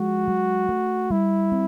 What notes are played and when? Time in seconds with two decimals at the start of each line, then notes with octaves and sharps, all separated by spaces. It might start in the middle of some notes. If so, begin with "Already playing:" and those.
Already playing: F3 G#3 F#4
0.28 F#3
0.69 A3
1.10 G3 E4
1.52 C4